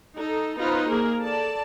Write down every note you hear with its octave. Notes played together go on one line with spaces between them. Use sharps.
D#4 A4
B3 D#4 F4 B4 C5
A#3 G#4 A#4
A4 D5 A5